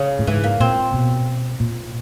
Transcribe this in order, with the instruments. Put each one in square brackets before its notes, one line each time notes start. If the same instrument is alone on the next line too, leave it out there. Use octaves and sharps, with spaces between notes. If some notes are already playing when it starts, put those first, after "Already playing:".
Already playing: [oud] C#3
[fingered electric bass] A2
[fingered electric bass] G#2 [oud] E3
[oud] A#3
[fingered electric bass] A#2 [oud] C4
[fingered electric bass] B2
A#2